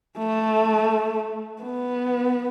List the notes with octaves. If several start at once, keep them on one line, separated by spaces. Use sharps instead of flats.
A3
B3